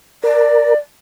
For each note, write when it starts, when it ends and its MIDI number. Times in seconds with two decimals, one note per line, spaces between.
0.23 0.74 70
0.23 0.76 74